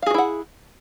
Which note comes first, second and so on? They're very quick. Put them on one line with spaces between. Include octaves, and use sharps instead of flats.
F5 G#4 F#4 E4 F#5